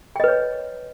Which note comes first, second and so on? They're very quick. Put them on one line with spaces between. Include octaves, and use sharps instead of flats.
G5 D#5 B4 C#5